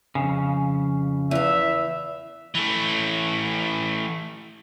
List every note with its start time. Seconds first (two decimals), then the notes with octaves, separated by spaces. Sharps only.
0.15 F2 C#3
1.31 E2 E5 F5
2.55 E3 A3